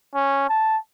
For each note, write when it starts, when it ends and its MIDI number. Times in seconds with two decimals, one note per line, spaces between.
0.15 0.47 61
0.49 0.78 81